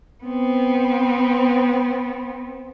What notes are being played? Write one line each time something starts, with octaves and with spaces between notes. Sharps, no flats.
B3 C4